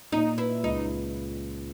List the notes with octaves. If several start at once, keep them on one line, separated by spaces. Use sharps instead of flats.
A#2 D#4
E4 B4
C#2 D#4